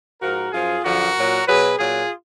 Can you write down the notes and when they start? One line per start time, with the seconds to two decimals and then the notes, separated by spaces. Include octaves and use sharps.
0.21 G#2 F3 F#4 A#4
0.52 F#2 F3 F4 G#4
0.83 F#2 D3 F3 F#4 A#4
1.15 A#2 F#3
1.46 B2 F#3 G#4 B4
1.78 A#2 F#3 F4 G#4